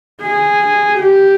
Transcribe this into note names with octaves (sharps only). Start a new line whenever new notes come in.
G#4
G4